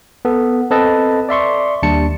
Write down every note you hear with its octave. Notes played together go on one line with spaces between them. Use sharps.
B3 A4
C4 A4 B4 D#5 A5
D5 E5 C6 C#6
D#2 G3 D4 A5 C#7